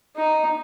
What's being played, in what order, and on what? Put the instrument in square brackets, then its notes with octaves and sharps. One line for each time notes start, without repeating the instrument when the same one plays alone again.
[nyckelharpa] D#4